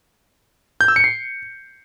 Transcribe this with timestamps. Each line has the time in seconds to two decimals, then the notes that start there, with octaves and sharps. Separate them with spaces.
0.81 G6
0.88 E6
0.96 C#7
1.04 C7